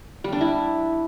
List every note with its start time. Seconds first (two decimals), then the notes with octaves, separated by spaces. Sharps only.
0.24 G3
0.32 D4
0.41 E4